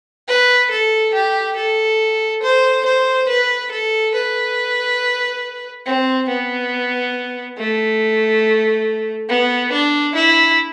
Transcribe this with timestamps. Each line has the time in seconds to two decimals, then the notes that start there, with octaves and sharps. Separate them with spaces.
0.28 B4
0.71 A4
1.14 G4
1.56 A4
2.43 C5
2.85 C5
3.28 B4
3.71 A4
4.14 B4
5.86 C4
6.29 B3
7.58 A3
9.29 B3
9.72 D4
10.16 E4